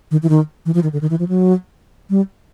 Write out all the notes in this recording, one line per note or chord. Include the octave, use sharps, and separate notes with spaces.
D#3
E3
D#3
E3
F3
D#3
D3
D#3
E3
F3
F#3
G3